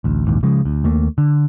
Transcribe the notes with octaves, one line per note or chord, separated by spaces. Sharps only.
A1 D2
A#1 D#2 G#2
C#3 F3 G#3
D2
D#2 A3 A#3
D3